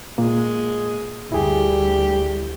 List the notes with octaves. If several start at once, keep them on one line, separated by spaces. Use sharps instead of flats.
A#2 G#3 A#3
D2 G3 E4 G4 G#4